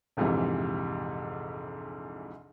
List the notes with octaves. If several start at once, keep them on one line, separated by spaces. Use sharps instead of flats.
A#1 F2 G#2 C3 E3